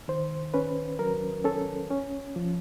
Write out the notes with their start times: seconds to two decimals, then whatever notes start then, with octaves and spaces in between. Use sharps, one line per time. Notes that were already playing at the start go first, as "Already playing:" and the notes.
0.08 D#3 C5
0.54 C#4 B4
0.99 F#3 A#4
1.45 C#4 A4
1.91 C#4
2.36 F3